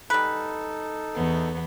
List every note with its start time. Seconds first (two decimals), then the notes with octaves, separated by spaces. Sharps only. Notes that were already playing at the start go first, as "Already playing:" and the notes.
0.10 G3 D#4 A4 B4
1.15 E2 B3